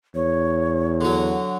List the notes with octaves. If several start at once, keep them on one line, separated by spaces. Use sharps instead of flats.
E2 C#5
D3 F#3